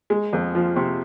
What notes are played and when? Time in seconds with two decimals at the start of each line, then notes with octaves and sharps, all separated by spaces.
0.10 G#3
0.33 F2
0.55 F3
0.76 C3